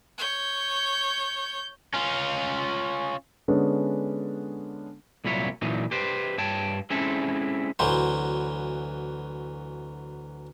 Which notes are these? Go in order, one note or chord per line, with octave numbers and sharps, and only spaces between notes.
C#5 G6
C#4 F4
D3 G#3 B3 C#4 D4
C2 A#2 F#3 E4 C#5
A#2 E3 F#3 D#4
G4 B4 C5
G2 C#5 G5 A5
G#3 C4 C#4 E4 A4
D2 E3 F#3 C5